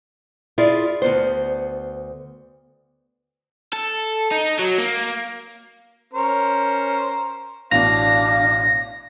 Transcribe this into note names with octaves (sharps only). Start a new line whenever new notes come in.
E4 F4 G#4 D5
D2 G2 B3 C5
A4
D#4
F#3
A#3
C#4 A#4 C5
A1 B2 D4 F5 A#6 F7